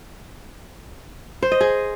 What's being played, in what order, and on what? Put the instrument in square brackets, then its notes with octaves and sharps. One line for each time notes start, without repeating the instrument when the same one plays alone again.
[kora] C5
D#5
G#4